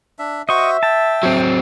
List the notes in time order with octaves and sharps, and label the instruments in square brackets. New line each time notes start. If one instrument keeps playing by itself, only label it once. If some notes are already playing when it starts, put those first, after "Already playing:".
[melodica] D4 E5
[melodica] F#4 C5 [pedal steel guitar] D#5 C#6 [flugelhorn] E5
[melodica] G5 [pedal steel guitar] A5
[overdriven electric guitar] F#3 C4